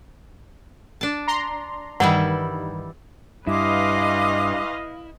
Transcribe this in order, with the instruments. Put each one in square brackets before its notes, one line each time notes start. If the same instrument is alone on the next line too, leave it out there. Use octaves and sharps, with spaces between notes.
[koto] D4 A5
[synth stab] A#5 C6
[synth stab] G2 D#3 [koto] E3 G3 E4 [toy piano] F#5
[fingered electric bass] G2 [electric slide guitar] E4 [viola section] B4 D#5 F5 [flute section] G#5 C6 D6